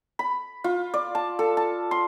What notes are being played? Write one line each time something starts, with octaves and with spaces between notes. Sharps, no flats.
B5
F4
D5
A5
A4
A5
C6